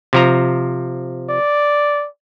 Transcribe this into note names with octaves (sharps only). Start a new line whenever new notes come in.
C3 F3 A#5
D5